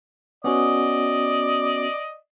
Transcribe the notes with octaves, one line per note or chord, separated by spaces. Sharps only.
B3 C#4 F#4 D5 D#5